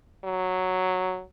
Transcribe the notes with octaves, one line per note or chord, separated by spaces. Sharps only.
F#3